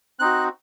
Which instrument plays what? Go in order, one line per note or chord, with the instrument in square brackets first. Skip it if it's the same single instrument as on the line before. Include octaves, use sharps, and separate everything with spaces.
[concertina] C4 D#4 F#4 F#6